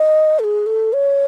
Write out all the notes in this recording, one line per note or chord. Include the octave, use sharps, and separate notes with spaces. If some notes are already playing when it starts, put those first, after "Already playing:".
Already playing: D#5
A4
G#4
A4
C#5